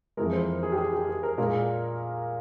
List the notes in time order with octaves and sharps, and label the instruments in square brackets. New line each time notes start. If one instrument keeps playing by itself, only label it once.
[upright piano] F2 E3 G#3 A#4
C5
G#4
G4
G#4
G4
G#4
A#4
A#2 G#3 A#4